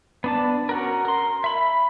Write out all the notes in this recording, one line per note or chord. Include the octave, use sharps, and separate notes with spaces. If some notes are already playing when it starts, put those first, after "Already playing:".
B3 D4 A5
C#4 F#4 A#4
A#4 C6
E5 B5